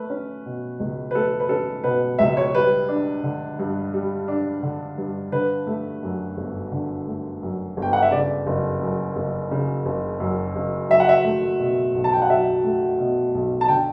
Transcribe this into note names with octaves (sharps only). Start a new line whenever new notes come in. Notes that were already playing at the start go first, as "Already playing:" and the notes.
Already playing: A3 B4
C#4
B2
C#2
B4
A3 A4
B4
C#4 A4
B2 B4
C#2 E5
C#5
G3 B4
D4
D3
G2
G3
D4
D3
G2
D3 B4
A3
F#2
G1
D3
A3
F#2
G1
G5
F#5
E5
C#3 D5
F#1
F#2
F#1
C#3
F#1
F#2
F#1
F#3 E5
F#5
E5
A3
B2
B1
A5
G5
F#5
F#3 E5
A3
B2
B1
A5
D3 G5